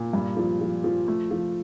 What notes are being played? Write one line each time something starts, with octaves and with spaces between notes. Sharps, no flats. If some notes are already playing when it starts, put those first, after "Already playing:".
Already playing: A#2
G2
F3
F3
F3
A3
F3